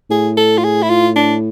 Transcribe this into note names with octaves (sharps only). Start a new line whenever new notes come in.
A2 G#4
A4
F4
G#4
E4
F4
D4